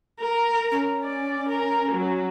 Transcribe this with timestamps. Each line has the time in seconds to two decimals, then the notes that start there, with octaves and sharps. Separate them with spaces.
0.20 A#4
0.71 C#4
1.04 D5
1.49 A#4
1.92 F#3